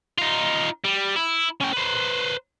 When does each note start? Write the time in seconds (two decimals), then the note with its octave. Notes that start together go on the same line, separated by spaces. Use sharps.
0.18 D#4 F4
0.85 G3
1.16 E4
1.60 C#4 G5
1.73 B4 C5